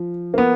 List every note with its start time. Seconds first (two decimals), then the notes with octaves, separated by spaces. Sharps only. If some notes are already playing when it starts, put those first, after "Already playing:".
Already playing: F3
0.34 A#3
0.38 B3